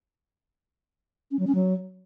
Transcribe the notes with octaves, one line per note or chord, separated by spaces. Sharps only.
C#4
F#3
C#4
F#3